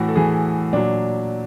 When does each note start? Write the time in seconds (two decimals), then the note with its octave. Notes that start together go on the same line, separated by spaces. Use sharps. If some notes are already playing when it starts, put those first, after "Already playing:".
Already playing: A2 E3 F#4
0.09 A4
0.16 A2 E3 G#4
0.73 A#2 F#3 D4